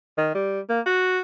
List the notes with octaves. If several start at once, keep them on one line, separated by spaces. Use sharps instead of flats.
D#3
G3
A#3
F#4